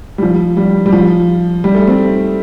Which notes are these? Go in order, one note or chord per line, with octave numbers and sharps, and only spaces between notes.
G3
F3
G3
G3
F3
G3
A3
C4